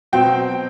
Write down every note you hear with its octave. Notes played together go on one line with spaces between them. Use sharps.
B2 F#3 C4 G5